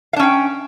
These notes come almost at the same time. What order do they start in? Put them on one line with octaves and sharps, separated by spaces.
F5 D4 C#4 G5